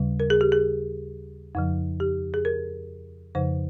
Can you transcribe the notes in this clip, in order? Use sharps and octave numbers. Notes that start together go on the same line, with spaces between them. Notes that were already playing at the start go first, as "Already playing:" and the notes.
Already playing: D#2 C#3 G3
A#4
G#4
G4
G#4
F2 C#3 F3
G4
G#4
A#4
F2 C#3 F3 C5